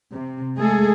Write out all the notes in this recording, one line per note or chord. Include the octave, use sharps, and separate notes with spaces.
C3
G#3 A3 G#4 A4